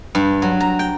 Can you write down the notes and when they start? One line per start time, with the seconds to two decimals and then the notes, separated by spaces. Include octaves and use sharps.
0.15 G2
0.42 F#3
0.60 A#5
0.79 G5